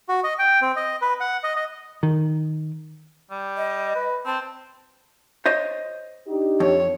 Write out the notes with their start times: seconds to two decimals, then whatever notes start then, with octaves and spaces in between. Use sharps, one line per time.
0.09 F#4
0.24 D#5
0.39 G5
0.61 C4
0.76 D#5
1.02 B4
1.20 F#5
1.44 D#5
1.56 D#5
2.03 D#3
3.31 G3
3.57 D#5
3.95 B4
4.26 C4 A5
5.46 C5 C#5 D#5
6.27 D4 D#4 G4
6.60 F2 C#5